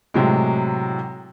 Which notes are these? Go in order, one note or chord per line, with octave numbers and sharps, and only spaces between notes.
A2 C3 F#3 G#3